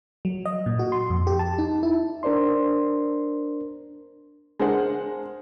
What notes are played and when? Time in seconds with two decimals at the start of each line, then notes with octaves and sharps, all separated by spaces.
0.25 F#3
0.45 D#5
0.66 A#2
0.79 F#4
0.92 C6
1.10 F2
1.27 G4
1.39 A5
1.58 D#4
1.83 E4
2.23 D4 A#4 C5 D5 C6
4.60 G#3 D4 A#4 C5 F#5